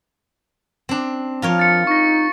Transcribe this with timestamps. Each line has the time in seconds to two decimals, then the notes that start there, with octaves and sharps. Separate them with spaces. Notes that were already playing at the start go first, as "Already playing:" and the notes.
0.89 C4 D4
1.42 F3 F4 A#4 C#5
1.59 A6 C#7
1.87 D#4 C#6 A#6